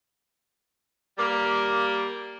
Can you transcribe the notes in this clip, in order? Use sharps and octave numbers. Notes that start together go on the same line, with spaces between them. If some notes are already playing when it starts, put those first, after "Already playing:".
G3 A#3